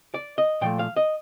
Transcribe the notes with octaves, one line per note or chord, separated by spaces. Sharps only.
D5
D#5
A#2 F3 A3 G5
F5
D#5